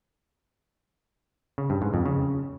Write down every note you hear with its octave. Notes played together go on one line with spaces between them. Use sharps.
C#3
G2
G#2
F2
C#3